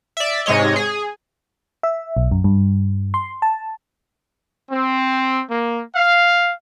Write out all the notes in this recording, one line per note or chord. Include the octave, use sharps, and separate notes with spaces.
D5 E5
G#2 C3 G#3 C#5 D#5
G#4
E5
B1
F#2
G2
C6
A5
C4
A#3
F5